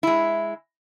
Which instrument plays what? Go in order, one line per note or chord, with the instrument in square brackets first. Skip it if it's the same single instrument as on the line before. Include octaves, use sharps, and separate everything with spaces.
[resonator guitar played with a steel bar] G#3 E4